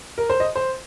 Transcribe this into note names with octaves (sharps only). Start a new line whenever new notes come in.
A#4
C5
D#5
C5